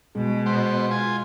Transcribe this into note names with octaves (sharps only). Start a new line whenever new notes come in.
B2 G#3
B3 C5
F4 G#5